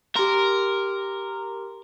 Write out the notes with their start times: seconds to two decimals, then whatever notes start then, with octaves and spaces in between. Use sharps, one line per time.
0.16 G4 A#4 C6